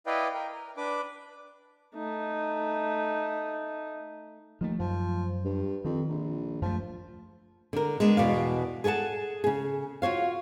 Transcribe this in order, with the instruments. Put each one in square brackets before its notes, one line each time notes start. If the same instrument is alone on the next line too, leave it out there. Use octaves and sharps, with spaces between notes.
[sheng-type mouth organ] E4 B4 D5 D#5 F5 G5
A#4 G5
A#4
D4 B4 D6
[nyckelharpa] A3 D#4
[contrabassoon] D#2 [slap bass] F3 A3
[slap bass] F#2 [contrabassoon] F3
[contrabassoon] G2
[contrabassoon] F2 [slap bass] D#3
[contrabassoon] A#1
[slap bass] F#2 A3 [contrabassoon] F3
[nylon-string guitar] D3 A#4
G#3 B3 D4
E2 B2 D5 F5
G#4 A4 D5 F#5 A5
C#3 G#4
F4 F#4 C#5 F5